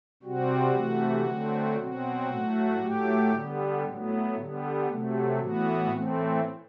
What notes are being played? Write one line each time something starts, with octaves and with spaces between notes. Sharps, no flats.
C3 G3 C4 F#4
C3 E3 A3
D3 F#3 A3 C4
B2 F#3 C4 F#4
A2 F#3 A3
A2 F#3 A3 G4
D3 G3 B3
A2 F#3 B3
D3 G3 B3
C3 F#3 A3
A2 E3 B3 F#4
A2 E3 A3 C4